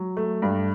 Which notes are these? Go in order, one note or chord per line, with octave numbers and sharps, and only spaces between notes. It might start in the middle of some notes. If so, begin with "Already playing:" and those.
Already playing: F#3
A3
G2